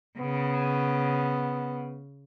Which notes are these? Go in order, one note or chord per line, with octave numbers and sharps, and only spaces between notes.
C#3 B3